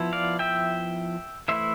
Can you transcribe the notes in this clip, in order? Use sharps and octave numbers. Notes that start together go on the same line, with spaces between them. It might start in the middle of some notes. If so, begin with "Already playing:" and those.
Already playing: F3 B3 E4
D5 F5
E5 G5
E3 A3 E4 C5 E5